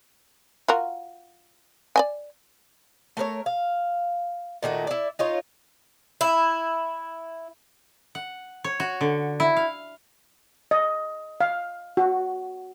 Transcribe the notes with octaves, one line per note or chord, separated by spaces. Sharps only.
F4 F#4 A#4
D5 D#5 G#5
A3 A#4 B4 C#5
F5
A#2 D#3 A3 F#4
E4 D5
D#4 F4 C#5
E4
F#5
C#5
F#4
D3
E4
F5
D#5
F5
F#4